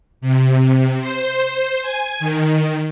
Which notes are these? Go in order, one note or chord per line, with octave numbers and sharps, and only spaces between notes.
C3
C5
G#5
D#3